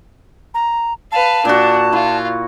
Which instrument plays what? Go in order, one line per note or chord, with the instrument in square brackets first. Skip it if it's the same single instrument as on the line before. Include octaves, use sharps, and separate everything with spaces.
[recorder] A#5
[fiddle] B4 F5 [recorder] A5
[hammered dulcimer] A#2 F#4 [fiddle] D4
[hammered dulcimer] E4 [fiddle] F4